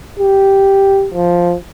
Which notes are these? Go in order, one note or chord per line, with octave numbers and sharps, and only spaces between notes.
G4
F3